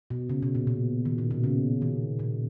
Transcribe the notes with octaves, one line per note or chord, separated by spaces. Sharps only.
B2
C#3
B2
A#2
B2
D#3
A#2
B2
C#3
D#3
A#2